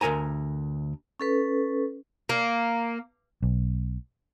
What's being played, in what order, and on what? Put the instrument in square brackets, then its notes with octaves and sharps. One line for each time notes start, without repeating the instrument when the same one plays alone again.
[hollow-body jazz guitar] D2 G#2 A#4 G#5 A#5
[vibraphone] C#4 A4 B4
[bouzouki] A#3
[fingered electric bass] B1